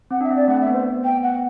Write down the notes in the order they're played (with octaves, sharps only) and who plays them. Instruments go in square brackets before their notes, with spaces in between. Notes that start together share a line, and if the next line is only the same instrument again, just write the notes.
[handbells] C4 [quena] F#5
[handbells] D4 [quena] E5
[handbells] C4
[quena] D5
[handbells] A3 [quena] F#5
[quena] E5
[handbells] B3
[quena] C5
G5
F#5